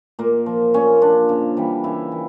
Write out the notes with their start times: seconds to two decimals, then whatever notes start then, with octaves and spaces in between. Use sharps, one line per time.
0.19 A#2 A#3
0.46 F3
0.74 A#2 C#4
1.01 F3 D4
1.29 C#3
1.57 E3 G3
1.84 C#3 E4
2.12 E3